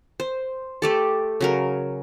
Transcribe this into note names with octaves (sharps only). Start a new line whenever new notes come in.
C5
A3 G4 A4
C#3 F#3 A#4